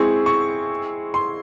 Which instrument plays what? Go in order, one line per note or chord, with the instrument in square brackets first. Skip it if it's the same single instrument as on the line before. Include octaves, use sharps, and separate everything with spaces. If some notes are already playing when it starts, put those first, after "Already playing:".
Already playing: [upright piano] G#3 C4 E4 G#4 [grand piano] C#6
[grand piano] C#6
C6